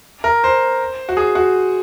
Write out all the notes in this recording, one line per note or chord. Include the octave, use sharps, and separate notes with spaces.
A#4
C5
F#4
G#4
F#4